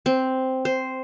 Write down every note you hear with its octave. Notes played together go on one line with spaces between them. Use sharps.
C4
C5